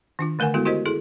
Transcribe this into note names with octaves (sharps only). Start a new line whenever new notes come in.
D#3 D4 F4
D3 A3 A#4 F#5 G#5
G#3 B3 E4 F#4 A4
E4 F#4 G4 A#4 C5 D#5
E4 G#4 A4